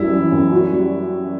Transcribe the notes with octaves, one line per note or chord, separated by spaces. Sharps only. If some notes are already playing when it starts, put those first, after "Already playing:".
Already playing: F#2 F#3 G3 E4
E3
F#2
F#4
G3